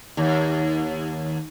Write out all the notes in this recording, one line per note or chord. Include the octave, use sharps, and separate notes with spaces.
D#2